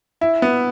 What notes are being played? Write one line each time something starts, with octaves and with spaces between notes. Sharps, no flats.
E4
B3